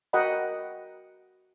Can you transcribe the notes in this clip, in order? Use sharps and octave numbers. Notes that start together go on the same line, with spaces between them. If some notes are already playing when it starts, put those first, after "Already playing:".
F#4 A#4 D#5 F#5 G5 B5